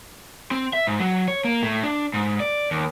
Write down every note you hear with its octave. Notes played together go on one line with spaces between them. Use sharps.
C4
E5
G#2
F#3
C#5
A#3
A2
D4
G#2
D5
D#2